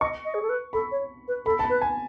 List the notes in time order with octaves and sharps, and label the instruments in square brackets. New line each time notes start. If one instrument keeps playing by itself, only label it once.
[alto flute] D#5 [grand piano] C#6
[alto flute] D#5
G#4
A4
B4
[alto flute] A4 [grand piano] B5
[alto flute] C#5
B4
[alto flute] A4 [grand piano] B5
[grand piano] A5
B5
[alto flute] B4
[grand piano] G#5